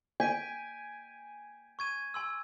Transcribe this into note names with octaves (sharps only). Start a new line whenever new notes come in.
G#5 G6 B6 D7
C#6 G#6 D#7
G#5 C6 E6